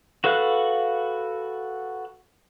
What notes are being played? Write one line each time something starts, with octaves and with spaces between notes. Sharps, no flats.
F#4 A4 B4 F5 F#6